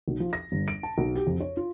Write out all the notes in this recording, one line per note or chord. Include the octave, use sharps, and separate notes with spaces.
B1
F3
A#6
G1
D7
A5
B1
G4
F2
C#5
F4